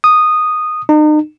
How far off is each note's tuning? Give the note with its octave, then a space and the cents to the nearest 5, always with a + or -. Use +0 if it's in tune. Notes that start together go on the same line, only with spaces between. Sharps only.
D#6 -10
D#4 -40